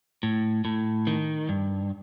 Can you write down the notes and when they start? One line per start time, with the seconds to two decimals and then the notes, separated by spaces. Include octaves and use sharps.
0.23 A2
0.65 A2
1.07 D#3
1.49 G2